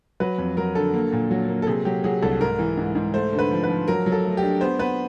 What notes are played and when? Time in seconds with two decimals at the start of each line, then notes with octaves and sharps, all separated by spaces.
0.20 F#3 B4
0.38 F2
0.57 F#3 A#4
0.75 D3 A4
0.94 A#3
1.12 A#2
1.31 F#3
1.48 A#3
1.62 A4
1.67 C3 G#4
1.85 F#3 G4
2.04 F#3 G#4
2.22 C2 A4
2.40 G#2 A#4
2.59 E3
2.77 G#2
2.95 G#2
3.14 A3 C5
3.33 D3
3.39 B4
3.51 F3
3.64 B4
3.69 F3
3.88 F#3 A#4
4.06 F#3
4.12 A4
4.25 A3
4.37 G4
4.43 D4
4.61 B3 C5
4.79 B3 B4